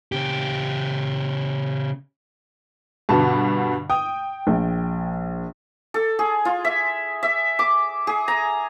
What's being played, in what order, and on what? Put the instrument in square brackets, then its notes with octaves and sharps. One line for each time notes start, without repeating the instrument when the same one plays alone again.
[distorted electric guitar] C#3 G4
[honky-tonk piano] G2 B2 D3 [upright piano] A5
[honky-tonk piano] G5 [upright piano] D#6
[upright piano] A#1
[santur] A4
G#4
F4
E5
E5
D6
G#4
A#5